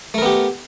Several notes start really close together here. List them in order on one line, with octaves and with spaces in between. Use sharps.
A3 A#4 B3 G4